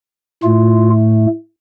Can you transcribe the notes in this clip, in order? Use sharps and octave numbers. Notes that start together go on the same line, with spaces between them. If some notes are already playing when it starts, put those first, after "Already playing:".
A2 A3 F4